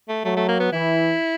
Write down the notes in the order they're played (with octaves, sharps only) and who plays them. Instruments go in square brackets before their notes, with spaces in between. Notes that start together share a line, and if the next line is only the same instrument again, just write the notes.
[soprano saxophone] A3
[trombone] F#3 [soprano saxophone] A3
[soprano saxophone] A3
A#3
B3
[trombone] E3 [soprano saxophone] E4